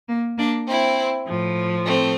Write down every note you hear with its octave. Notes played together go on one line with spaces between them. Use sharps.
A#3
A#3 D4
C4 E4
A2 F3
A3 C4